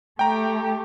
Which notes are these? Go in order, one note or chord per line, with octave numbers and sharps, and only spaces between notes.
A3 G4 G5 A#5